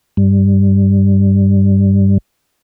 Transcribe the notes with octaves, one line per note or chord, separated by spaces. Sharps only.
G2 G3